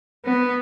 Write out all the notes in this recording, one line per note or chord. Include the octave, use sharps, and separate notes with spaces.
B3